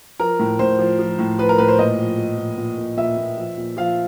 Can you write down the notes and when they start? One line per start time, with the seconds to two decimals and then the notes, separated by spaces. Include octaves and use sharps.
0.20 F3 A#4
0.39 A2
0.59 A2 C5
0.79 F3
0.99 F3
1.19 A2
1.39 F3 B4
1.49 A#4
1.58 A2 B4
1.68 C5
1.79 A#2 D#5
1.99 F3
2.18 F3
2.38 A#2
2.58 A#2
2.78 A#2
2.97 A#2 E5
3.17 A#2
3.37 F3
3.57 A#2
3.77 F3 F5